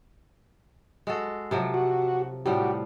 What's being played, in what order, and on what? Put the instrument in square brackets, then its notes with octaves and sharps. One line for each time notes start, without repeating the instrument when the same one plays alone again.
[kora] G#3 F#4 A4
C3 F3 F#3
[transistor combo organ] F#4
[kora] A2 F3 G3 [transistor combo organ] F#4 G4